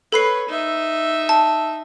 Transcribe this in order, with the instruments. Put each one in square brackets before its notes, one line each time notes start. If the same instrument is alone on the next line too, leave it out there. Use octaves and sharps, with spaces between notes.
[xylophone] A4 B5 C7 [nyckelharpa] B4 C#5
[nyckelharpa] D#4 E5
[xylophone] A5